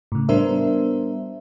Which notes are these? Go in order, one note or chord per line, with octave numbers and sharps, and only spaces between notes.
A2 C#3
G3 B3 D4 A#4 C5 E5